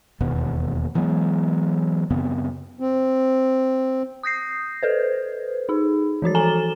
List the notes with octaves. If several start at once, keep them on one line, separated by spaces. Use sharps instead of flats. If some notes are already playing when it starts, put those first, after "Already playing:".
E1 D#2 B2 B3
E3 F#3 G#3 B3
F#2 C#3 B3 C4
C4
D#6 G6 A#6 C7
A4 B4 C5
D#4 G#4
E3 F3 F#4 A6
A4 G#5 A#5 E7 G7